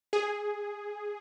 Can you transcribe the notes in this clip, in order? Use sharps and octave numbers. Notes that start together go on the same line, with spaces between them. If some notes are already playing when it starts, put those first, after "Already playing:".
G#4